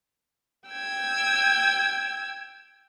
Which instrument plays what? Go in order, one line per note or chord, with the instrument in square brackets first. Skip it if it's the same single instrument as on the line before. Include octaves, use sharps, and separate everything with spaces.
[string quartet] G5 E6 G#6